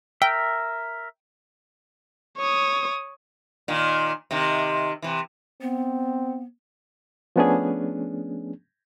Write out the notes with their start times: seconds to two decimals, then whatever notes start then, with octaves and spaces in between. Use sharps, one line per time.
0.22 A#4 E5 G5
2.38 C#5 D#6
3.68 A#2 D#3
4.31 C3 D#3
5.02 C3 E3
5.61 B3 C4
7.36 F3 A3 B3 C#4 D4 G#4